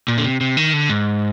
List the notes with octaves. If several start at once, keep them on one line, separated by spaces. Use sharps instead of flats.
A#2
D3
C3
C3
D#3
D3
G#2